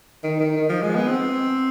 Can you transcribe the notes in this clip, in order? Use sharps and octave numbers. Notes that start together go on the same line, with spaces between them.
D#3
D#3
D#3
F3
G#3
B3
C4